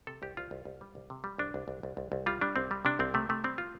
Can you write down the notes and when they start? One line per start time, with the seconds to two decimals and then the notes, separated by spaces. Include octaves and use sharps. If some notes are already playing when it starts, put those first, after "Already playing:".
0.07 C3 A4
0.22 C2 G4
0.37 C2 F4
0.51 C2
0.65 C2
0.81 G3
0.95 C2
1.10 C3
1.24 G3
1.38 C2 D4
1.54 C2
1.68 C2
1.83 C2
1.97 C2
2.12 C2
2.26 G3 F4
2.41 G3 D4
2.56 C2 C4
2.71 G3
2.85 C3 D4
2.99 C2 C4
3.14 C3 A3
3.29 C3 A3
3.44 G3 C4
3.58 F4